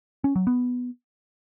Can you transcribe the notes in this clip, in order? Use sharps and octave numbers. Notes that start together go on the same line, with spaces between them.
C#4
F#3
B3